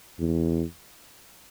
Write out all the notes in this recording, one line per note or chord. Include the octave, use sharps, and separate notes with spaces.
E2